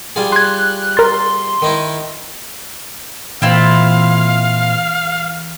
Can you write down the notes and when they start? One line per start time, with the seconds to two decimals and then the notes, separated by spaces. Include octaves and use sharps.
0.16 G3 F4 G#4
0.32 C6 F#6 G#6
0.97 A#4 C6 A6
1.62 D#3 D#4 E4
3.42 A#2 E3 C4 E4 F4 C5 F5